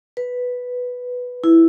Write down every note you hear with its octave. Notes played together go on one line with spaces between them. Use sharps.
B4
E4